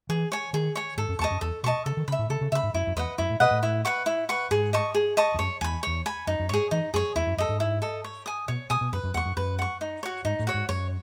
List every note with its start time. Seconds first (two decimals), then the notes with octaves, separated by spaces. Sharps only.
0.09 E3 G#4
0.32 C#5 G#5
0.53 D#3 G#4
0.75 C#5 G#5
0.97 G#2 A4
1.09 F#2
1.19 E2 D#5 A5 C#6
1.31 F#2
1.41 E2 A4
1.63 B2 D#5 A5 C#6
1.86 C#3 A4
1.97 D#3
2.08 C#3 B5
2.12 E5
2.19 A2
2.29 C#3 A4
2.41 C#3
2.52 C#3 E5
2.55 B5
2.63 G#2
2.74 F#2 E4
2.87 F#2
2.96 E2 B4 D#5 F#5
3.18 F#2 E4
3.29 A2
3.40 B2 B4 D#5 F#5
3.51 A2
3.63 E4
3.85 B4 F#5 C#6
4.06 E4
4.29 B4 F#5 C#6
4.51 G#2 G#4
4.73 D#5 A5 C#6
4.94 G#4
5.17 D#5 A5 C#6
5.34 E2
5.39 F#2 C#5
5.61 E2 G#5 B5
5.83 E2 C#5
6.06 G#5 B5
6.27 F#2 D#4
6.39 F#2
6.49 G#2 C#5
6.53 G#4
6.71 E3 D#4
6.94 F#2 G#4 C#5
7.16 E2 E4
7.27 F#2
7.37 F#2 A4 D#5
7.49 G#2
7.60 E4
7.82 A4 D#5
8.04 C#5
8.26 G#5 D#6
8.48 B2 C#5
8.70 B2 G#5 D#6
8.81 B2
8.92 F#2 B4
9.04 F#2
9.14 E2 F#5 C#6
9.25 F#2
9.37 F#2 B4
9.59 F#5 C#6
9.81 D#4
10.03 F#4 C#5
10.25 G#2 D#4
10.39 A2
10.47 F#4 C#5
10.54 G#2
10.69 F#2 C#5